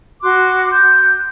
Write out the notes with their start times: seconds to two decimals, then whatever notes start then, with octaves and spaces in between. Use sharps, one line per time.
0.23 F#4 C6 D6 F#6
0.70 G6